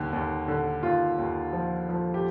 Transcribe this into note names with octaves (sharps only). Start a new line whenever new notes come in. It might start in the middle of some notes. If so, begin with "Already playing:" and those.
Already playing: D#2 D3
D#2
D3
D#2 F4
D#2
F3
F3
G4